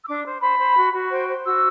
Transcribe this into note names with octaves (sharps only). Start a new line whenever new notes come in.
E6
D4 D6
C5
C5 B5
C5
F#4
F#4
C5 G5
C5
F#4 E6